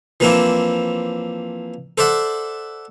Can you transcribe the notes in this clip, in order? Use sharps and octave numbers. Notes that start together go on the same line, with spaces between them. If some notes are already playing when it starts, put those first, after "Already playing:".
E3 F3 A#3 C4 D4 E4
A4 C5 D5 E5 F#5